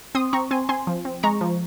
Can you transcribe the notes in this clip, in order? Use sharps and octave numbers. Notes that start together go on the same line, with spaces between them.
C4 C6 D#6
C4 A#5 C#6
C4 G#5 C6
C4 G#5 C6
F3
C4
G#3 A#5 C#6
F3